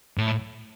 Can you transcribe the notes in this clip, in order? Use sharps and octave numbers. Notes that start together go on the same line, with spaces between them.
A2